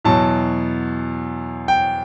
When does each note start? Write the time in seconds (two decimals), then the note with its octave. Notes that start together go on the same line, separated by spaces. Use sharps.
0.05 E2 B2 F#3 A5
1.68 G5